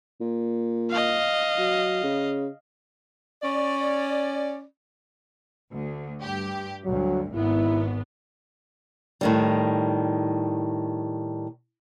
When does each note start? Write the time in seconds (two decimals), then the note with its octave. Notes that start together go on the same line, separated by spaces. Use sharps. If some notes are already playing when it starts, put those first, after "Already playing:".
0.21 A#2
0.90 D#5 F5
1.58 F#3
2.04 C#3
3.43 C#4 D5
5.70 D2
6.21 G2 G4
6.85 D2 G2 F#3
7.34 G#1 G#2 B3 E4
9.21 A2 D#3 G3